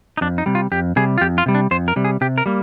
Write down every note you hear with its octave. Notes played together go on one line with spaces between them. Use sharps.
D#4
F2 D4
D#4
C3 G3
F4
F2 G4
C3 G3 G#4
F4
F2 G4
F4
C3 G3
D4
F2 C5
A#4
C3 G3
G#4
C3 G4
A#4
G3 A#3